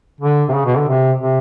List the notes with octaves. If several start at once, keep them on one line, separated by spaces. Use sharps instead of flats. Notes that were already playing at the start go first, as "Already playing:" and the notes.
D3
C3
C#3
B2
D3
C3
C3